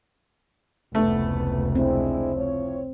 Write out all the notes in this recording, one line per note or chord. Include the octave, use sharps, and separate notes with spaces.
F1 C#2 E3 A3 B3
G#3 C4 D4 E4
F3 E4 C#5